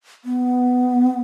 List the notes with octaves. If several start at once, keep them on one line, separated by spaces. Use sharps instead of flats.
B3